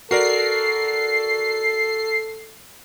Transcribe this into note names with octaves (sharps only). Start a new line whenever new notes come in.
F#4 A4 A#4 D5 C7